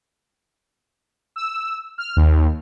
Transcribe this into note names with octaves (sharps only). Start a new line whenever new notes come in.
E6
F6
D#2